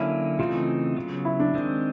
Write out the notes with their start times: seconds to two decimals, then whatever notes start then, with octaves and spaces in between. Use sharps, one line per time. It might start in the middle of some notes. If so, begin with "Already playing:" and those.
Already playing: D3 F#3 A#3 C#4 E4
0.39 C#3 E3 A3 C4 D#4 F4
0.97 C#3 F#3 B3
1.25 E4
1.40 D4
1.54 D#3 G#3 C4